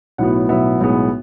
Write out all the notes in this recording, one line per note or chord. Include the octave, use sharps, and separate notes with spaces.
B1 A2 F#3 B3 F#5
B1 A2 F#3 B3 E5
B1 A2 G#3 B3